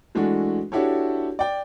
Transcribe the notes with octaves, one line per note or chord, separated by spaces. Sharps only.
E3 G#3 A3 D4 F#4
D4 E4 F#4 G4 A4 C#5
D5 G5